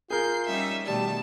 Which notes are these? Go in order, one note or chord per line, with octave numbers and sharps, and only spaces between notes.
F4 G#4 A#4 G6 C7
G3 C#4 D#4 E5
B2 D#3 G3 A3 A5